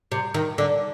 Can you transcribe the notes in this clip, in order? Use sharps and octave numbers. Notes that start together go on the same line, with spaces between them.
C3
D#3
D3